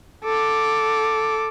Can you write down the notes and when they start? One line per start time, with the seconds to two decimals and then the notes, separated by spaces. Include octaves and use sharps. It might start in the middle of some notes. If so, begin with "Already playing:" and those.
0.24 A4 D6